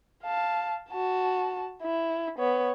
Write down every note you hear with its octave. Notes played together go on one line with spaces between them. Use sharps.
F5 A5
F#4 A5
E4
B3 C#5